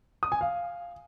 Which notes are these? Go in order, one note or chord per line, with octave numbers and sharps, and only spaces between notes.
D#6
G#5
F5